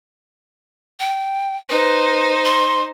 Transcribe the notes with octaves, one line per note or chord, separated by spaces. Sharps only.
G5
D#4 B4 C5
C6